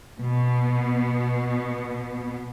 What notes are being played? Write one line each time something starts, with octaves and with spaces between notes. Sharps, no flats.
B2 B3